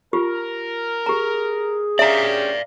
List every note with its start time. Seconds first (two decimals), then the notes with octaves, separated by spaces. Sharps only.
0.13 F4 G4 A#4
1.06 G4 G#4 A#5
1.99 C#4 D4 G4 D5 E5 F5 A#5